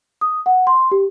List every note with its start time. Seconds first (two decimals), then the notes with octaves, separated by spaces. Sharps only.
0.21 D#6
0.46 F#5
0.67 C6
0.92 G4